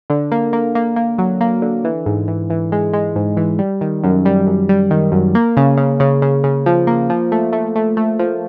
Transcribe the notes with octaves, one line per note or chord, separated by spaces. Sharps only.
D3
A#3
A#3
A#3
A#3
F#3
A#3
D3
E3
G#2
E3
E3
G#3
G#3
G#2
E3
G3
D#3
F#2
G3
F#2
G3
D#3
F#2
A#3
C#3
C#3
C#3
C#3
C#3
F3
A#3
F3
A3
A3
A3
A3
F3